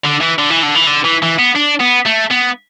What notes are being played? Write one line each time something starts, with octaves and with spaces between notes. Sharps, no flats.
D3
E3
D3
E3
D3
E3
D3
E3
E3
B3
D4
B3
A3
B3